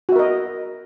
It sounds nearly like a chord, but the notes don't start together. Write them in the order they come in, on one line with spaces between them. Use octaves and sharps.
F#4 E5 A#4 D#5